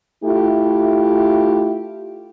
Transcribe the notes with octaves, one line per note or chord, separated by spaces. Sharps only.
A3 E4 F4 G4